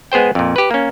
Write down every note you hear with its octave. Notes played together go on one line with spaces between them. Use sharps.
G#3 B3 G#4 C5 G5
F2 A#2
G4 B4
A#3 C#4